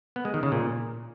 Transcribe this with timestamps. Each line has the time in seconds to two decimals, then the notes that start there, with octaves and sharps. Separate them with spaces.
0.16 B3
0.25 G#3
0.34 D#3
0.43 C#3
0.52 A#2